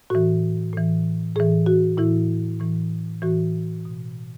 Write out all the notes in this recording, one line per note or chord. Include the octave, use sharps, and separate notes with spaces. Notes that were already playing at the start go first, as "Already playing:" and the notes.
A2 E3 F#4
A2 E3
A2 E3 G#4
F#4
A2 E3 E4
A2 E3
A2 E3 F#4
B2